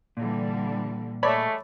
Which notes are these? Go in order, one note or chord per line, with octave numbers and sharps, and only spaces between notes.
A#2 D3 E3 G3
G#3 A3 C#5 D5 B5